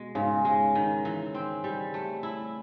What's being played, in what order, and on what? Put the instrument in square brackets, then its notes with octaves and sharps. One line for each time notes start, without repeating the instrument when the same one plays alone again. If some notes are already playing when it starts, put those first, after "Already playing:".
Already playing: [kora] B2 G#3
[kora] G#2 [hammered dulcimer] C#3
[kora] G#3
D#3
E3
C4
G3
A3
E4